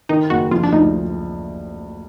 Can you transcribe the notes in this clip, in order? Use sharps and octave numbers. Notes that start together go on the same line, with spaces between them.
D#3 D#4
F#1 F#4
F3 F4
D4
D2 D#4